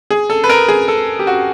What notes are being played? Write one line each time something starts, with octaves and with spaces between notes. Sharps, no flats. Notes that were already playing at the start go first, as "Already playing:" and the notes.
G#4
A4
B4
A#4
G#4
A4
G4
F#4